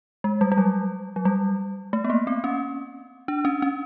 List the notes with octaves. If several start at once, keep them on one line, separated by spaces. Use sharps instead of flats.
G#3
G3
G3
F#3
F#3
G3
A3
B3
A#3
C4
C#4
D4
C#4
C#4